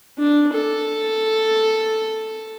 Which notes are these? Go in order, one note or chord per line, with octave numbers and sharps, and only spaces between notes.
D4
A4